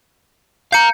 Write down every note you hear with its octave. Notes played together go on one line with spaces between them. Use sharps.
F5 A#5 G6 C#7